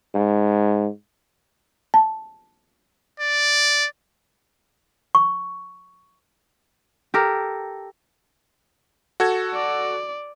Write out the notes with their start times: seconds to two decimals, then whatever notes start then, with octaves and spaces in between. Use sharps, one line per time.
0.14 G#2
1.94 A5
3.20 D5
5.15 C#6
7.14 G4 A4 A#4
9.20 F#4 A4 G#6
9.54 D5